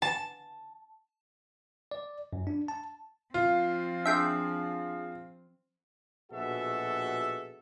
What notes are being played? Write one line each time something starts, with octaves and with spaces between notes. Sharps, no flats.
A5
D5
F#2
D4
A5
F3 C4 F4
D4 G#4 E5 G5 C6
A#1 B2 F#4 G#4 A4 E5